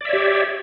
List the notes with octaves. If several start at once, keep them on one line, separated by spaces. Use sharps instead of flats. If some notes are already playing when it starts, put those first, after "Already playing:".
G4 C#5 D5 E5